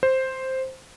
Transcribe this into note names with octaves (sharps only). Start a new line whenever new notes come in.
C5